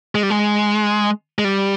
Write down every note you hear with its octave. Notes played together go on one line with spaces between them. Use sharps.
G#3
G3
G#3
G#3
G3